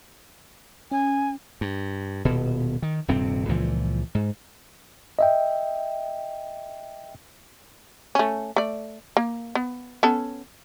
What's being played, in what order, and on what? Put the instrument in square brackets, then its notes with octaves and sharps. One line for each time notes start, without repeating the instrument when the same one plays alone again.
[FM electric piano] C#4 [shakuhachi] G#5
[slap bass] G2
D#1 B2
D#3
D#1 G2 C3 C4
C#2 A#2 E3 F3
G#2
[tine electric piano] D#5 E5 G5
[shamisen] A3 C#4
A3 D5
A#3
B3
B3 C#4 A4